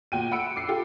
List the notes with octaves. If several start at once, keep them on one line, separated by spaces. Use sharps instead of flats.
A#2 F#4 G5 D#7
F#5 B5 E6 C#7 D7
D6 C7
F4 G4 A4